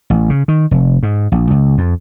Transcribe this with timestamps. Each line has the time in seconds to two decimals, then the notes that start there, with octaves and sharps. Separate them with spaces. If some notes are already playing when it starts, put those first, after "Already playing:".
0.10 A1
0.30 C#3
0.48 D#3
0.71 F1
1.03 G#2
1.32 A#1
1.51 C#2
1.78 F2